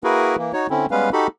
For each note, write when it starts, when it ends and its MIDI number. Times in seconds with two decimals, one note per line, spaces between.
0.04 0.36 58
0.04 0.36 64
0.04 0.36 66
0.04 0.36 68
0.04 0.36 70
0.04 0.36 71
0.37 0.52 52
0.37 0.52 58
0.53 0.67 63
0.53 0.67 66
0.53 0.67 73
0.70 0.86 50
0.70 0.86 60
0.70 0.86 61
0.70 0.86 64
0.91 1.10 55
0.91 1.10 56
0.91 1.10 59
0.91 1.10 61
0.91 1.10 71
0.91 1.10 77
1.13 1.27 63
1.13 1.27 66
1.13 1.27 67
1.13 1.27 69
1.13 1.27 83